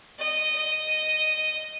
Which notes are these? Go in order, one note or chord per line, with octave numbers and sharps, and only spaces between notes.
D#5
D#5